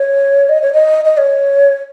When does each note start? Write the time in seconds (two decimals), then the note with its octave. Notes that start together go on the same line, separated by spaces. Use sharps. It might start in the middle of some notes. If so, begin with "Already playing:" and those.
Already playing: C#5
0.49 D#5
0.62 C#5
0.73 D#5
1.05 D#5
1.17 C#5